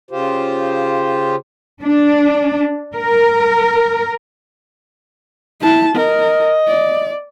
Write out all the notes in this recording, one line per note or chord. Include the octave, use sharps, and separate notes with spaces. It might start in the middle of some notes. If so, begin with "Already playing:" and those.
C#3 F4 G4 C5
D4
A#4
E4 A5
A#4 D#5
D5